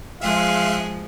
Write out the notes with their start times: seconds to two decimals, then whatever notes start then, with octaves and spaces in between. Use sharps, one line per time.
0.21 F3 G#3 G#4 E5 F5 C6 F#6